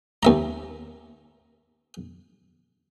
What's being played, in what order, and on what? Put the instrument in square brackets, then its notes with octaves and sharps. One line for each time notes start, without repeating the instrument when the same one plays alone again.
[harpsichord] D#2 E5 A#5